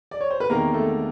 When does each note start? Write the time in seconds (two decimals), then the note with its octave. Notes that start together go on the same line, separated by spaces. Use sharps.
0.11 D5
0.21 C#5
0.31 C5
0.40 B4
0.50 E2 C3 D#3 G#3 A#3 A#4
0.74 A3 A4